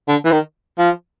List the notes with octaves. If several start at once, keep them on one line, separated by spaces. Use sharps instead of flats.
D3
E3
D#3
F3